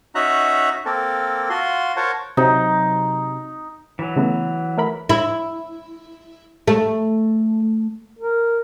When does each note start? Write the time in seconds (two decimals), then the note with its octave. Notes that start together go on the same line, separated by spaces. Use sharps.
0.15 C#4 D#4 F#4 E5 A#5 F#6
0.85 A#3 C4 A4 A#4
1.50 F4 F#4 C6
1.96 A#4 C5 C#5 F#5 A5
2.37 C3 F#3 D#4
3.99 E3 F#3
4.16 C#3 A3 B3
4.78 A3 A#4 B5
5.09 E4
6.68 A3
8.19 A#4